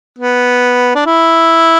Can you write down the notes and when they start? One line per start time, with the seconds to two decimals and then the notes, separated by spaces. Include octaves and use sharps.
0.19 B3
0.95 D4
1.05 E4